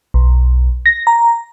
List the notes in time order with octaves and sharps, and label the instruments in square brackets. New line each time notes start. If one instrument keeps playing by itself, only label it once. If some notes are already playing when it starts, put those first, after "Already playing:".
[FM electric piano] B1
A#6
A#5